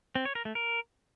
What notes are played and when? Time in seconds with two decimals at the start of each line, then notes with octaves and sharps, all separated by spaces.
0.15 C4
0.25 C#5
0.35 A#4
0.45 A3
0.55 A#4